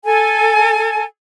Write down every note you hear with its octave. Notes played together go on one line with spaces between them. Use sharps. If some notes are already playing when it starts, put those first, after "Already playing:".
A4 G#5